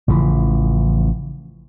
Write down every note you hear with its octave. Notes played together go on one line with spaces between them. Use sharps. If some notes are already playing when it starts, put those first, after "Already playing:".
A1 C#3 E3 F3